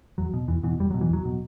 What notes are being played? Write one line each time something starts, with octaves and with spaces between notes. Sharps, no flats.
E2 F#3
B2
E2 E3
B2 E3
E2 G3
B2 F#3
E3
E2 F#3
B2